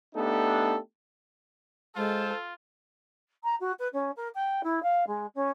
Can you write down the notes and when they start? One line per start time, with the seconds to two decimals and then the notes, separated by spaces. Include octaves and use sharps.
0.15 A3 B3 D4 D#4 G4 A4
1.96 G#3 F4 A4 C5
3.43 A#5
3.60 F#4
3.79 B4
3.93 C#4
4.16 A#4
4.34 G5
4.63 E4
4.82 F5
5.07 G#3
5.35 C#4